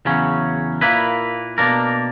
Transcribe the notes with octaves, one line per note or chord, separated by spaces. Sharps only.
E2 C#3 F#3 C#4
A#2 A#3 E4 B4
B2 A#3 D4 A#4